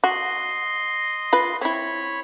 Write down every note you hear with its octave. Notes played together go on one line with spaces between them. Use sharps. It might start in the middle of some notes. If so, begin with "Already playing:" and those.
F#4 D#5 C6
F4 B4
C4 E4 C#5 B5